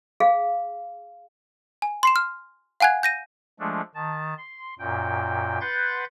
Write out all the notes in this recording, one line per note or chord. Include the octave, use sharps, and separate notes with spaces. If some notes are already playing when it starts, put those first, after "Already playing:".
G#4 F5
G#5
C6 C7 E7
F6
F5 F#5 G#5 F#6 G#6
G6 A#6 D#7
F3 G#3 A3 D4
D#3 A5
C6
F#2 A#2 G5
B4 F#5 C6 G6 A6